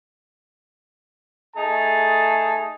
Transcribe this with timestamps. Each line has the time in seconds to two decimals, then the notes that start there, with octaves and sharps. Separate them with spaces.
1.56 A3 D#4 G#4 A5